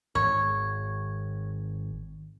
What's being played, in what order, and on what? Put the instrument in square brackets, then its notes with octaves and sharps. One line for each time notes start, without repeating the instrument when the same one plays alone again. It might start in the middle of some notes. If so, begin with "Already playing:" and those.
[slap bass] G#1 [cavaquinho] C#5